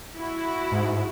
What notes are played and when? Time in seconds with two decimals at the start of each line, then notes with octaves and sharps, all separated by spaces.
0.16 E4 F#4
0.72 G#2